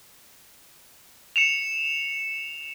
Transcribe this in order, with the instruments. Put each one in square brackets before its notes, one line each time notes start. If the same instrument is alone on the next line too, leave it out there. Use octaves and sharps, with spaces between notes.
[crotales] C#7 E7 F7